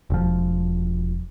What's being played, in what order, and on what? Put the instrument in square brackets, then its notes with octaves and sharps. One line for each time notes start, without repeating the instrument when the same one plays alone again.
[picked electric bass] E1 F3